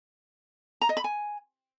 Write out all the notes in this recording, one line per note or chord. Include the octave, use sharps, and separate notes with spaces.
A#5
D#5
B5
G#5